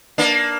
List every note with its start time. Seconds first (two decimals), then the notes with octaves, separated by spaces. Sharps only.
0.18 A#3 D4